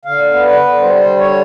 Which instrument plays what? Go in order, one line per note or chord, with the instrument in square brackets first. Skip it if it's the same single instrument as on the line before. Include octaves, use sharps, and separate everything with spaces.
[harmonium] D3 F5
B3
B4
D3
G3 C5
D3
C#5